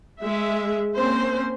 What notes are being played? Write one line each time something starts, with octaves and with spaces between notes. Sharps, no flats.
G#3 E5
A#3 C4 C#4 C5